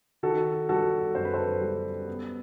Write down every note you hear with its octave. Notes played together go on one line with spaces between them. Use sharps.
D#3 F#4 A4
G3 F#4 A4
F#2 C5
B4
A4 C5
G3
B3